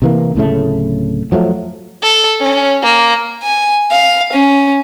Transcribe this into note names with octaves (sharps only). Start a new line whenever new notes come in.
C3 E3 A#3
D1 A2 C#3 A3
F3 F#3 G#3 A3
A4
C#4
A#3
G#5
F5
C#4